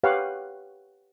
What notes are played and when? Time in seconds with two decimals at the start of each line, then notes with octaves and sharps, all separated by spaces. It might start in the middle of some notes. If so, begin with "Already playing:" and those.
0.03 G4 B4 C#5 F5 F#5